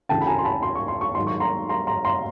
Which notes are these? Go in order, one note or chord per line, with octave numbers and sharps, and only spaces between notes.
D2 C#3 E3 G5 A5
B5
G#5 A#5
C6
A5 B5
C6
C#6
C6
C#6
G#2 D#3 F#3 C6
C#6
A#5 C6
A#5 C6
A#5 C6
A#5 C6